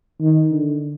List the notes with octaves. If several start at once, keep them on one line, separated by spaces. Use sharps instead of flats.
D#3
D3